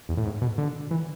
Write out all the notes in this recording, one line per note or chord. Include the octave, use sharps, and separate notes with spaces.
E2
A2
G#2
B2
D3
E3